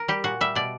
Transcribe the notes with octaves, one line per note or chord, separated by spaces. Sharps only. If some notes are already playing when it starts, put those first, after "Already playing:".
Already playing: A#4
G3 G4
A#2 F#4
G3 E5
B2 D5